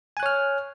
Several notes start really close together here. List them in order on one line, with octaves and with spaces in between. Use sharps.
G#5 F#6 C#5 F6